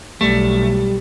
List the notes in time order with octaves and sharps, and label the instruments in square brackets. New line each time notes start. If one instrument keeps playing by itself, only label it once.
[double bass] B1 [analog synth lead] G3 [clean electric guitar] A3